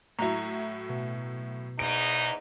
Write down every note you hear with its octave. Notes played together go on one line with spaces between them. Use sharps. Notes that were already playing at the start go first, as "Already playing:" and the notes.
A2 F#3 E4 A#5
B2
E2 G#2 D#4 D7